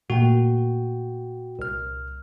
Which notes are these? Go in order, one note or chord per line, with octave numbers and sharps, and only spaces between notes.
A#2 A3 A#3 F#4 G5
C2 F6